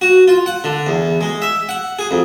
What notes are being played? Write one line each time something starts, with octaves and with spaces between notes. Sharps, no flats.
F#4
F4
F#5
D3
E2
G#3
E5
F#5
G#4
F2